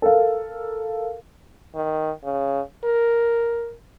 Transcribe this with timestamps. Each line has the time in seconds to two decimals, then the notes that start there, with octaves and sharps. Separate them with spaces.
0.02 A4 A#4 F5
1.75 D#3
2.24 C#3
2.84 A#4